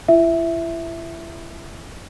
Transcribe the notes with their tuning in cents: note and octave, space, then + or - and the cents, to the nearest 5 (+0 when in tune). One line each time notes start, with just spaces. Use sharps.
E4 +40 E5 +0